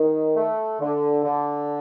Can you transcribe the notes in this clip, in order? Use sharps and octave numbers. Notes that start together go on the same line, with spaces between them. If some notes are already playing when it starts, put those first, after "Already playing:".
Already playing: D#3
A3
D3
D3